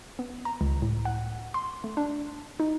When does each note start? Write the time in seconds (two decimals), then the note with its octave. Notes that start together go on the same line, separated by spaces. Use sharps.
0.19 B3
0.45 A#5
0.61 C#2
0.82 A2
1.05 F#5
1.54 C6
1.84 A3
1.97 D4
2.60 D#4